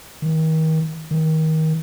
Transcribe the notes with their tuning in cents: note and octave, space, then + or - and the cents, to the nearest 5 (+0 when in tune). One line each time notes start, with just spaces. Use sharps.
D#3 +35
D#3 +25